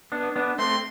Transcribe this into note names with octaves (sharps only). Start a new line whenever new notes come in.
B3 D4
B3 D4
A3 C4 C6